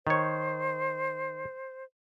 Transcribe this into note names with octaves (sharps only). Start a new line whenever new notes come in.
D#3 C5 C#5